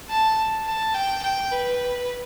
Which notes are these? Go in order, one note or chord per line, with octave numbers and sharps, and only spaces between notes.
A5
A5
G5
G5
B4